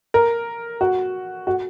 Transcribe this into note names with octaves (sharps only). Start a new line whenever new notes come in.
A#4
F#4
F#4